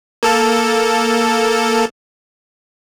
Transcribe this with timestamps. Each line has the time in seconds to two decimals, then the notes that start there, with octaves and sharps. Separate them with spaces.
0.23 A#3 A4